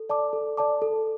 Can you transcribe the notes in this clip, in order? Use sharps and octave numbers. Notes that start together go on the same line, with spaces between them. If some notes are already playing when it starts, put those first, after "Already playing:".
Already playing: A4
D5 A5 D6
A4
D5 A5 D6
A4